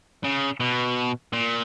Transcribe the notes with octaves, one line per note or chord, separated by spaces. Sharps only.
C#3
B2
A#2